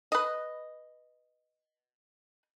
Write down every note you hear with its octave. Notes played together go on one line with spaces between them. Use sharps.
B4 D#5